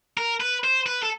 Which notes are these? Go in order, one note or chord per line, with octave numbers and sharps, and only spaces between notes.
A#4
B4
C5
B4
A4